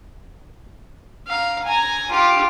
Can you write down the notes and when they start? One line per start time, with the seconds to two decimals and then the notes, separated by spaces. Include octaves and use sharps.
1.27 F5 A#5
1.64 G#5 A#5
2.10 F4 G4